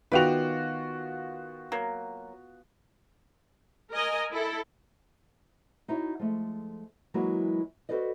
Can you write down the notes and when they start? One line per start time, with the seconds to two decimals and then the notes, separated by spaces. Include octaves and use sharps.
0.12 D#3 B3 F4 F#4 B4 D5 G5 F7
1.72 F#3 A#3
3.91 A#4 D#5 G#5
4.32 E4 A4
5.88 D#4 E4 F#4 C#5
6.19 F3 G#3 A3
7.14 E3 F#3 G#3 A#3 E4 F#4
7.89 F#4 A4 B4 C5 D5 D#5